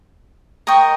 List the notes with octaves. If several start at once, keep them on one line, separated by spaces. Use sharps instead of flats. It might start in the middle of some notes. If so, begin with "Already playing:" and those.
A#4 D#5 G5 C#6